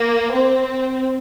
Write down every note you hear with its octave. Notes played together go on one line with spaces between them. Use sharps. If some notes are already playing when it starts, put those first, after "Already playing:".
Already playing: A#3
C4